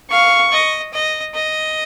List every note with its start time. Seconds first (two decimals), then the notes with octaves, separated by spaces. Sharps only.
0.11 F5 C#6
0.52 D#5
0.93 D#5
1.34 D#5